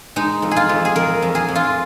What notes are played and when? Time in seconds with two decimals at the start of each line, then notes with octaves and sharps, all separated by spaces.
0.16 G#3 D#4
0.42 F2
0.51 G#4
0.56 F4
0.69 F2
0.85 G#4
0.96 F2 A#4
1.22 F2
1.35 G#4
1.48 F2
1.55 F4